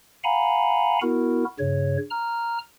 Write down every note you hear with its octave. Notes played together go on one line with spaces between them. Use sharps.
F5 F#5 G#5 A#5 B5
B3 E4 F#4 A#4
G2 C#3 C#5
A#5 F6